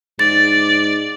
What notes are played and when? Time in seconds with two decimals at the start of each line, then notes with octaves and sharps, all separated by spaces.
0.19 G#2 D5 A6